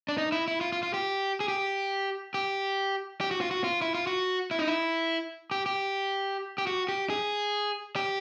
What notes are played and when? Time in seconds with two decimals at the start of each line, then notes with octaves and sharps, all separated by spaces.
0.09 D4
0.18 D#4
0.32 E4
0.48 E4
0.61 F4
0.72 F4
0.83 F4
0.94 G4
1.40 G#4
1.48 G4
2.34 G4
3.21 G4
3.31 F#4
3.41 F4
3.51 F#4
3.64 F4
3.82 E4
3.95 F4
4.07 F#4
4.51 E4
4.59 D#4
4.68 E4
5.51 G4
5.66 G4
6.58 G4
6.67 F#4
6.89 G4
7.10 G#4
7.96 G4